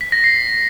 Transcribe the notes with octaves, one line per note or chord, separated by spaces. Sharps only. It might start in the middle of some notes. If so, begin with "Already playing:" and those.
B6
A#6
C7